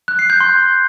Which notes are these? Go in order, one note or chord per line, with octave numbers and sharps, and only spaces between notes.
F#6
C7
G6
C6